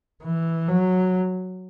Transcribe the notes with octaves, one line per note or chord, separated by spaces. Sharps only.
E3
F#3